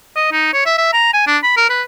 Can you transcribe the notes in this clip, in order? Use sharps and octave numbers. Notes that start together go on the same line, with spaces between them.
D#5
D#4
C#5
E5
E5
A#5
G#5
D4
B5
A#4
B4